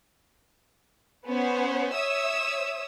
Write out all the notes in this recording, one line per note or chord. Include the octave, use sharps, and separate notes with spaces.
B3 C#4 C5 C#5
C#5 E5 D#6 E6